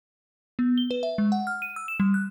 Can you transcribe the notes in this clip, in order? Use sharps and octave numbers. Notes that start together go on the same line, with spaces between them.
B3
G7
B4
E5
G#3
F#5
F6
D#7
E6
E7
G3
F#6